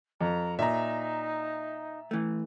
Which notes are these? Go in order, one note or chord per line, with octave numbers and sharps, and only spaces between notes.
F2 A#5
A#2 D#4 E5 A#5
E3 A3